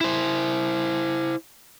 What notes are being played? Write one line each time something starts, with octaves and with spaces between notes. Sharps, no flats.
E4 C5